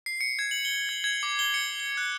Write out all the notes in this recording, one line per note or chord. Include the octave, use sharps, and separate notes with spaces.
C7
C#7
G#6
F#7
G7
G#6
G#6
D6
G7
C#7
G7
F#6